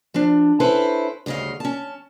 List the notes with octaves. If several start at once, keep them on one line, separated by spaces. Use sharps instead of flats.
F3 D4
C#4 E4 A4 B4 C5
D2 G2 C#3 D#5 F5
C#4 A5